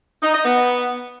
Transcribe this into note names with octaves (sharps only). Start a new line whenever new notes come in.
D#4
D#5
B3